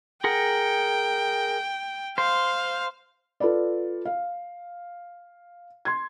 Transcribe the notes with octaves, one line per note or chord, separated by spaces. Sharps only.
G#4 A#4 F#5 G5
C5 F5
F4 A4 B4 D5
F5
C6 G#6